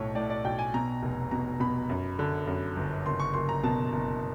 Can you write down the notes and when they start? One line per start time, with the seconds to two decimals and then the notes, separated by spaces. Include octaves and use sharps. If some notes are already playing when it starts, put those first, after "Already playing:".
Already playing: B1 A2 C#5
0.15 A2 D5
0.30 D5
0.45 B1 G5
0.59 G#5
0.74 B2 A#5
1.02 F1
1.31 B2 A#5
1.60 B2 B5
1.89 F#2
2.19 D3
2.47 F#2
2.76 G1
3.06 F#1 C6
3.20 C#6
3.34 F#1 C6
3.49 A#5
3.63 B2 A5
3.92 F#1